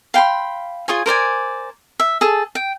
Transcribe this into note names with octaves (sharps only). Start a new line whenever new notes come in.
F5 G5 B5 C6
F4 G#4 C#5 G#5
A#4 C5 D5 G#5
E5
G#4 A4 A5
G5